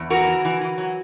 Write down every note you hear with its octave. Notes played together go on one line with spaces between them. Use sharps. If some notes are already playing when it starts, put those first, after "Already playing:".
Already playing: E2
E3 F#4 A#4
E3
E3
E3
F#3